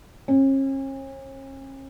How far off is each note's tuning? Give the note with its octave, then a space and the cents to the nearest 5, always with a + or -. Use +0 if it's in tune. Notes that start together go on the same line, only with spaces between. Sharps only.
C#4 -40